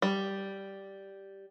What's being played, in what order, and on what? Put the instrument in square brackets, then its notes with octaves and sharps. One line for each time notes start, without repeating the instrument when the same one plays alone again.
[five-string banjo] G3